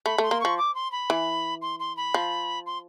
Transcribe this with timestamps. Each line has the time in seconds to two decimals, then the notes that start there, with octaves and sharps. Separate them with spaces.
0.06 A3 B5
0.18 A3 C6
0.31 A#3
0.41 F3 C#6
0.58 D6
0.75 C6
0.92 B5
1.10 E3
1.62 C6
1.80 C6
1.97 B5
2.14 F3
2.66 C6